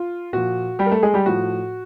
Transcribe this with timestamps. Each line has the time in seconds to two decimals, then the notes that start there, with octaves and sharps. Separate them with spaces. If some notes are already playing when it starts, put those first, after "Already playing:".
Already playing: F4
0.33 A#2 F3 F#4
0.79 G3 G4
0.86 A#4
0.91 A3 A4
1.03 G#3 G#4
1.14 G3 G4
1.26 A2 F3 F#4